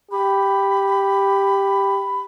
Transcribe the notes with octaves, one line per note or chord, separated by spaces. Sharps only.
G4 B5